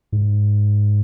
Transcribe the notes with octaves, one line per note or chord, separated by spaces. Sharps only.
G#2